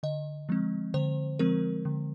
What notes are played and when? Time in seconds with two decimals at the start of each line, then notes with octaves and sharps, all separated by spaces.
0.03 D3 D#5
0.49 F3 G#3 C4
0.94 D3 C5
1.39 F3 G#3 C4 A#4
1.85 D3